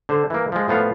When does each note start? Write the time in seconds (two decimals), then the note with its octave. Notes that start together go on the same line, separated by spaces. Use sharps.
0.09 D3 C5
0.30 E3 A#3
0.52 F3 G#3
0.68 A2 F3 B3 F5